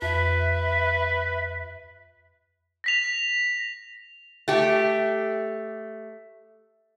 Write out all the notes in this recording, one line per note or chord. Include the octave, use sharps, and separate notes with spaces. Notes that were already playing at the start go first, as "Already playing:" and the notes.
F2 B4 E5
A#6 B6 F7
A3 G4